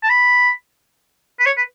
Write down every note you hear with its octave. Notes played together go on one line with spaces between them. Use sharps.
A5
B5
B4
C#5
B4